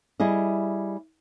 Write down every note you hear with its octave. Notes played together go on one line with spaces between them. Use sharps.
G3 E4 G#4 D#5